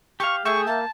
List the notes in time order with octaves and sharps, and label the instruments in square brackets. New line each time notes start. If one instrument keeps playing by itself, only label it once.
[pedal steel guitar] G4 F5 [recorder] C#6
[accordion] A3 G#4 [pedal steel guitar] E5 G5 [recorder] C#6
[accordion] A#3 [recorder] A5